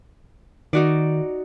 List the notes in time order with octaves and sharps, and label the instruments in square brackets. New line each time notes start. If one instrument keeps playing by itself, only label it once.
[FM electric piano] D#3 [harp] D#4 F#4 D5